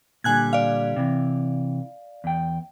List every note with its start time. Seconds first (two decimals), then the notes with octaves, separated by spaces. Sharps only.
0.24 A#2 D3 G3 G#5 F#6 G#6
0.53 D5 F5
0.96 C3 E3
2.24 E2 G5